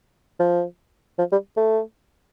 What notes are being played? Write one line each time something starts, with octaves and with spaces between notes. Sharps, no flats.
F3
F3
G3
A3